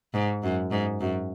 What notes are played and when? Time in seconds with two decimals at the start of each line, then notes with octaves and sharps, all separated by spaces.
0.13 G#2
0.43 F#2
0.71 G#2
1.00 F#2